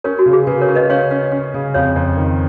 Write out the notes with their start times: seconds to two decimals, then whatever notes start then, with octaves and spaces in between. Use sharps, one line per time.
0.04 C#4 A#4 C#5
0.19 F#4
0.26 C#3
0.33 G#4
0.47 C#3 B4
0.61 A#4 C#5
0.68 C#4
0.75 B4 D#5
0.90 C#4 C#5 F5
1.11 C#4
1.32 C#4
1.54 C#3
1.74 F2 C#5 F5
1.96 F2
2.17 D#3